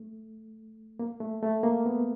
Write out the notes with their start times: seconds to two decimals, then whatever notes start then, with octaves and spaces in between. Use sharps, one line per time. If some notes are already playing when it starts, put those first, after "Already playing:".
Already playing: A3
0.99 A#3
1.20 A3
1.42 A3
1.63 A#3
1.86 B3